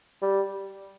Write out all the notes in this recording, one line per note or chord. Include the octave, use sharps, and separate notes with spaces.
G3